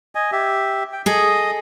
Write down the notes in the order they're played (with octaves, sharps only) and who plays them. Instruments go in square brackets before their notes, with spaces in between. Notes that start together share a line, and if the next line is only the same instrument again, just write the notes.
[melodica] D#5 G#5
G4 E5
G5
[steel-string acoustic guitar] G#4 A4 [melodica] D#5 D#6